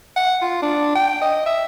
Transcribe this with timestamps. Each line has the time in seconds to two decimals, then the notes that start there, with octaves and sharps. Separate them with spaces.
0.17 F#5
0.42 F4
0.62 D4
0.96 G5
1.22 D#5
1.46 E5